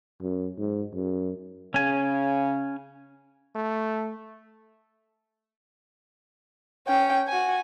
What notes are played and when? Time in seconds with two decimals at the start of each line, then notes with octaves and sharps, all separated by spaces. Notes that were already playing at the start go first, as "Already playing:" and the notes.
0.21 F#2
0.58 G#2
0.94 F#2
1.74 C#3 C#4 G#5
3.56 A3
6.87 C#4 G5
7.28 F#4 G#5